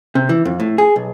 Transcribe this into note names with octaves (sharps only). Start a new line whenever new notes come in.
C3
E3
F2
A2
G#4
B1